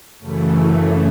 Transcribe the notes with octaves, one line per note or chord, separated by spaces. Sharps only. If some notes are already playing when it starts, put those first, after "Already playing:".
F#2 C#3 E3 A3